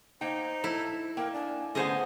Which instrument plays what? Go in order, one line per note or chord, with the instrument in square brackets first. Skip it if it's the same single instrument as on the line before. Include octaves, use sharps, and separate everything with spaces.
[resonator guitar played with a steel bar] A#3 G5 [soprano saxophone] D#4 [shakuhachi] C5
[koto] E4 [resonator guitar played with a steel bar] A4
[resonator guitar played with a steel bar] A#3 [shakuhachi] A#4 [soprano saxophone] G5
[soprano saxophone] D4 [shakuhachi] G#5
[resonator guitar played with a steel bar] D3 C#4 G#4 [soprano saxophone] A3 [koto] B3 C5 D#5